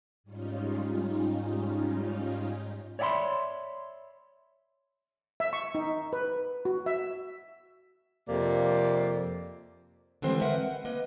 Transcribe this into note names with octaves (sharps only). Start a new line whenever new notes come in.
G#2 G3 C#4 D#4 F4
C#5 D5 E5 F#5 B5 C6
E5
C#6
D#4
B4
F#4
E5
F2 C3 A#3 D5
D3 E3 G3 G#3 C4 C5
A#4 B4 D#5 E5 F#5
F#5
A#3 B4 D#5